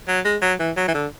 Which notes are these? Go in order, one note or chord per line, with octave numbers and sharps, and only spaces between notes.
F#3
G#3
F#3
E3
F#3
E3
D3